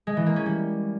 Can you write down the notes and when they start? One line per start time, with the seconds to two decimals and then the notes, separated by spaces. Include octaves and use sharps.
0.07 G#3
0.17 E3
0.26 A#3
0.36 C#4
0.46 G3